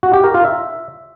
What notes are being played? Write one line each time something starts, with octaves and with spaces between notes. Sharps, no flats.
F#4
G4
A#4
F4
E5